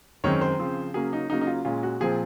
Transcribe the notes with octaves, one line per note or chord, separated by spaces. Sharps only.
F#2 D#3 G#3 C4 C#5
C5
C#3 F3 C4
C#3 F#3 A#3 C#4 G#4
D#4
C#3 F#3 A#3 C#4 D#4
D#4
F4
A#2 G#3 C#4 F4
F#4
A#2 F3 C4 G#4